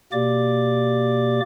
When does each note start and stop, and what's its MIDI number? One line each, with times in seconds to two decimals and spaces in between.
0.12 1.40 47
0.12 1.40 58
0.12 1.40 67
0.12 1.40 74
0.12 1.40 86